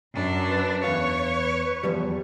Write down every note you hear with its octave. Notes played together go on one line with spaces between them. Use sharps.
F#2 D4
B4
E2 C#5 F5
E2 F3 G3